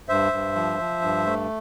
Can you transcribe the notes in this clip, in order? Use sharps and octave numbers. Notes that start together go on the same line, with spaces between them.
G2 C5 E5
G2
F3
F3
G2
A3